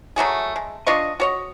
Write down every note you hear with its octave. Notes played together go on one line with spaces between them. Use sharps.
F#3 A3 F#4 G#4
G#3
D4 F4 D#5 C#6
F#4 C#5 D#5